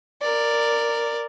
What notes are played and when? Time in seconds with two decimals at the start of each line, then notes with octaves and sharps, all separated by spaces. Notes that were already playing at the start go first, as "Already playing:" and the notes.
0.22 A#4 D5